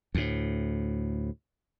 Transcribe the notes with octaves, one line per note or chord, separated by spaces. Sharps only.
D2 A2